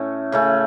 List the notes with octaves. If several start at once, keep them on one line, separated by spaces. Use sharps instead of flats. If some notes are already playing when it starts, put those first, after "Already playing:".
Already playing: A2 A3 C#4
C#3 A3 C#4